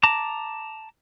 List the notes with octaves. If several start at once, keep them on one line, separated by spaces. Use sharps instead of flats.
A5 A#5 D6